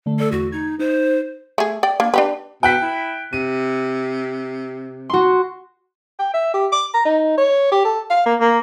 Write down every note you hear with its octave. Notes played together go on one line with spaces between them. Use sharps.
D3 A3
A3 A4 D5
E2 F#4
D#4 G#6
D#4 C5
A3 G#4
D5 G5
A#3 D4
D4 G4 B4
B2 G5 F#6 B6
E4
C3 D#7
F#4 C6
G5
E5
G4
D6
A#5
D#4
C#5
G4
A4
F5
A#3
A#3